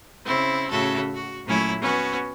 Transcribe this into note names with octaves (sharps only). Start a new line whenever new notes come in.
C#3 C4 E4
A2 C#3 F#4 A4 E5
F#4
A#2 F#3 A3 C#4 E4
B3 C#4 F#4